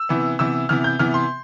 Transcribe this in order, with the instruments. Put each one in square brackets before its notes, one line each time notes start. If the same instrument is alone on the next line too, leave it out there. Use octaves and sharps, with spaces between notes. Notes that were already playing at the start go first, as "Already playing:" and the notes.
Already playing: [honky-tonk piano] E6
C3 E3 B3
C3 E3 B3 E6
C3 E3 B3 F6
G6
C3 E3 B3 F6
C6